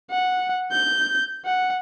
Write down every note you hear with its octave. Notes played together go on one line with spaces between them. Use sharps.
F#5
G6
F#5